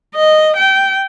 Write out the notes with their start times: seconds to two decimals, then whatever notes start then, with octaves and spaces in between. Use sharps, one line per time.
0.15 D#5
0.57 G5